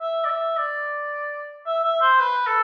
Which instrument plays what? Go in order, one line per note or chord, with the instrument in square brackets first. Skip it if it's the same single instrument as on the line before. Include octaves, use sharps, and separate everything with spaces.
[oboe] E5
D5
E5
D5
E5
E5
C5
B4
A4